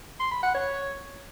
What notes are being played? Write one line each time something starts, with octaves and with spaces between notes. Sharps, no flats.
C6
B5
F#5
C#5